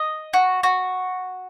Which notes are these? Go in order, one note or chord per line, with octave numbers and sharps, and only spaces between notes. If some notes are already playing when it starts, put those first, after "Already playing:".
Already playing: D#5
F#4
F#4